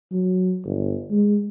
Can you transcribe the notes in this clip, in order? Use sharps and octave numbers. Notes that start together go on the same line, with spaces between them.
F#3
G1
G#3